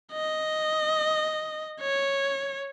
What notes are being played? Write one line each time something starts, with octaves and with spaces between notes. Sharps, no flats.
D#5
C#5